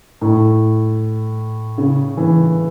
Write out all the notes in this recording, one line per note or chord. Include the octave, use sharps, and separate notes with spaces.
A2
C#3
E3